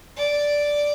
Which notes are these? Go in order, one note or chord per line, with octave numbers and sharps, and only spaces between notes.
D5